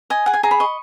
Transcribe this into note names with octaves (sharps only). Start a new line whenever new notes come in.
D#5 G#5
G#4 F#5
G#5
G#4 A#5
B5
D#5 C#6